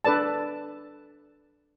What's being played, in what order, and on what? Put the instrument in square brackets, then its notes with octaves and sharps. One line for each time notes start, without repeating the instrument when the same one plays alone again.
[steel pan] D4 A4 B4 D5 A5